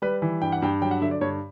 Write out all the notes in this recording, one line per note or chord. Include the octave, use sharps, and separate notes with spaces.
G3 B4
E3
G2 G5
F#5
G2 G5
F#3 G5
F#5
D3 E5
D5
G2 C#5